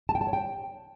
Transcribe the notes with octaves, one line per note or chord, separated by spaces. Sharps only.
A5
G5
A5
C#5
G5